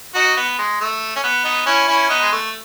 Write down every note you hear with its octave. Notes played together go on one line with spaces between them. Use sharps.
D#4 F#4
B3
G#3
A3
C#4
B3
B3 D#4
C#4 E4
C#4 E4
B3 D#4
G#3
A3